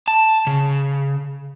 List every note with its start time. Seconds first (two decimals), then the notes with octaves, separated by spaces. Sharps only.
0.08 A5
0.47 C#3